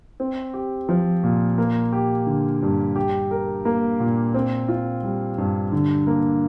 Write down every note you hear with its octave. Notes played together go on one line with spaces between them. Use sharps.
C4
G4
F3
A#2
A#3
G4
D3
G2
G4
A#4
A#3
A#2
C4
F4
G3
G2
D3
A#3